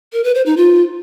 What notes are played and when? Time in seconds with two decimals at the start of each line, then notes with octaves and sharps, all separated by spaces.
0.13 A#4
0.24 B4
0.35 C5
0.46 D#4
0.57 F4